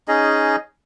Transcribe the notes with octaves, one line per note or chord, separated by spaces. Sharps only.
C#4 D#4 G#4 D#5